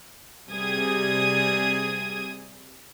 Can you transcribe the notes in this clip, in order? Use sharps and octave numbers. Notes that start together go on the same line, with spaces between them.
C3 G3 G#4 D#6 G#6